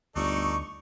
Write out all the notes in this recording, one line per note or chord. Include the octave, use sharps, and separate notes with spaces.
G1 D2 D#4 A4 D5 C#6